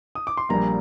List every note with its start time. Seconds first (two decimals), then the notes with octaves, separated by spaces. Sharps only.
0.15 D#6
0.27 D6
0.37 C6
0.49 A#1 A#2 G3 A#3 A#5